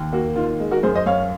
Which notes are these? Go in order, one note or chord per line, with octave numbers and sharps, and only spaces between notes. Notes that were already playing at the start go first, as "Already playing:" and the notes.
Already playing: D#2
A#3 F#4
D#3 F4
G#3
F#4 A#4
F#2 G#4 C5
C5 D#5
F#2 C#5 F5